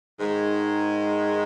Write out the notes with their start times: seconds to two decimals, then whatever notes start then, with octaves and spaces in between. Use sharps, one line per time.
0.19 G#2 D#3 G#3